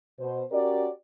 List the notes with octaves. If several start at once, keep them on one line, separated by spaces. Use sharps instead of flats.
B2 C5
C#4 F#4 G4 A#4 D5